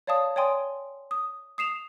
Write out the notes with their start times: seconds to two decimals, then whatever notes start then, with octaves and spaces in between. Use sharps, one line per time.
0.07 C#5 D5 F5 A5 D#6
0.36 C#5 D5 G5 G#5 C6 D#6
1.11 D#6
1.58 D#6 C7 E7 F7